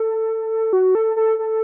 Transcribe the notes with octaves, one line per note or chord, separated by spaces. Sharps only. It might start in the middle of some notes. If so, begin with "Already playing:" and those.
Already playing: A4
F#4
A4
A4
A4